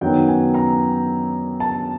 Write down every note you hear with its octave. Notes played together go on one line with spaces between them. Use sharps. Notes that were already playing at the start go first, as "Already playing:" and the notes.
F#2 D#3 F#3 B3 D#4 G5
G#5
A#5
A5